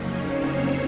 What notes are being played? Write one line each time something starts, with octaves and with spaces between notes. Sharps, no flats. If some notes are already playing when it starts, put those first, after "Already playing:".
Already playing: F2 C#3 F#3 A#3 C#4 D#4 C#5
C4 C5
C4 C5